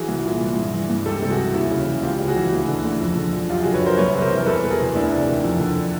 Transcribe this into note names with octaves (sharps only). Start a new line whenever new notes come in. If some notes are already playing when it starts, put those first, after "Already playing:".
Already playing: E3 F#4 G#4
C2
A#2
C2
G2
E3
G2
C#2 G4 A4
C3
F#4 G#4
E3
D#2 E4 F#4
C#3
E3
C#2 F4 G4
C#3
F#4 G#4
E3
D2
D3
D2
F2
D3
F2
F#2 F4 G4
D3 F#4 G#4
B4 C#5
F#2 A#4 C5
C2 B4 C#5
C3
A#4 C5
E3
A#4
E2 A4 B4
B2
G#4 A#4
E2
D2 D4 E4
C3
D#3
F2
D3